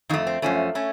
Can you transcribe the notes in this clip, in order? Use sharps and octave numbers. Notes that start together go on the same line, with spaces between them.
F2 D#3 A3 D#4
C4
F#2 F3 A3 C#4
A3 C#4